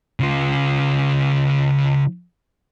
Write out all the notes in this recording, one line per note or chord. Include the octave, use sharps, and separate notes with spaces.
C#3 F4